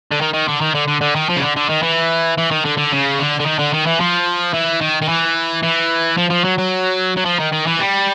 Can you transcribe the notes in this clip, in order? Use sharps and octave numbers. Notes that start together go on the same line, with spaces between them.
D3
D#3
D#3
D3
D#3
D3
D3
D3
D#3
F3
C#3
D3
D3
D#3
E3
E3
D#3
D3
D3
C#3
D3
D3
D#3
D3
D#3
E3
F3
E3
D#3
D#3
E3
E3
F3
F3
F#3
F#3
F#3
F3
D#3
D#3
E3
G3